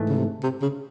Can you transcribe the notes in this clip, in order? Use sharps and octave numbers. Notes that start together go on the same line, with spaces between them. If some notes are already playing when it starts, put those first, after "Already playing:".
Already playing: G#2 E3 A3
C#3
C3
C3
C#3